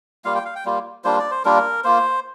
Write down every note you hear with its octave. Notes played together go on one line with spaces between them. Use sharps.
G3 A#3 F4 F5
G5
F5
G5
G3 A#3 F4
G3 A#3 D4 F4 C5
D5
C5
G3 A#3 D4 F4 A#4
A#3 F4 C5